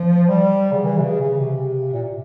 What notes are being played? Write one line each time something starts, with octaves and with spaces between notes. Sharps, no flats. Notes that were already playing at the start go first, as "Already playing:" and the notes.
Already playing: F3
G3
C#3
E3
C3
C#3
C#3
C3
A#2